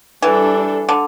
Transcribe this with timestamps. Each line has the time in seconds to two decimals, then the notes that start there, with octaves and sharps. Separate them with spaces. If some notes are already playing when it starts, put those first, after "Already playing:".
0.22 E3 G3 D4 A4
0.89 D3